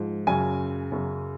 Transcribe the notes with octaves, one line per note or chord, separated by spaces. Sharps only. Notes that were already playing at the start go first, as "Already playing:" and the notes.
Already playing: G#2 F3
F#2 C#3 F#3 G#5
F#2 C#3 F#3